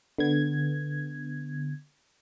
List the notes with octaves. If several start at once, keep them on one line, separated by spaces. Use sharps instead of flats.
D3 B3 G#6